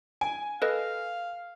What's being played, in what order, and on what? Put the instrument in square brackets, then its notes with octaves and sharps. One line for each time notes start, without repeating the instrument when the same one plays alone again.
[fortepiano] G#5 [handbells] D7
[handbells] A4 B4 D#5 [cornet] F5